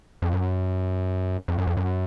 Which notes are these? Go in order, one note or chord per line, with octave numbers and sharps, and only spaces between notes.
F2
F#2
F2
F#2
F2
F#2